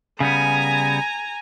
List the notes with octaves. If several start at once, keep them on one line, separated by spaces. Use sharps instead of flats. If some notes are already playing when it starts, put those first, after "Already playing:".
C#3 G3 B3 G#5 A#5